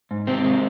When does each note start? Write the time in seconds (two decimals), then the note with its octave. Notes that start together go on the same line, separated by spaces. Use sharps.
0.11 G#2
0.27 C3 C4
0.44 G#3